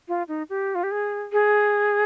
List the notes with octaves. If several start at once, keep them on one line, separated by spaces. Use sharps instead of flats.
F4
D#4
G4
F4
G4
G#4
G#4